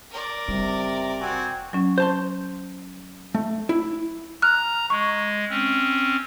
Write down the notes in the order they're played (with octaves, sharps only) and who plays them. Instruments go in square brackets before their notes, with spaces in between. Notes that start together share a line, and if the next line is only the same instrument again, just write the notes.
[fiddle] A#4 D5
[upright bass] F#1 G3 [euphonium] C3
[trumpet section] C4 F#4 G#5
[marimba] F#3 C#4
[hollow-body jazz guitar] C5 A5 C6
A3
E4
[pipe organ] A#5 [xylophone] F6 F#6
[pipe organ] G#3 [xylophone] C#6
[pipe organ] C4 C#4